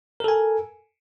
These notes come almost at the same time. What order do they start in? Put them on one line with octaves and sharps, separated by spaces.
A#4 A4 G#5